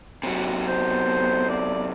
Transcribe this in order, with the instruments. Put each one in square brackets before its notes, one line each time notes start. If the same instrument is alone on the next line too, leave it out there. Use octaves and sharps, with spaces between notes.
[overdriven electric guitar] C3 F#3
[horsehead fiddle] B3 [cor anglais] C5
[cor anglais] D5